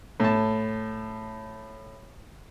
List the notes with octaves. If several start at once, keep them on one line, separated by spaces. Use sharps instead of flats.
A2 A5